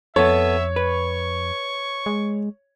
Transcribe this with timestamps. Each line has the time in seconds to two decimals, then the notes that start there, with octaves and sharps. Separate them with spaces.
0.16 F2 B3 A4 C#5 E5
0.76 B4 C#6
2.06 G#3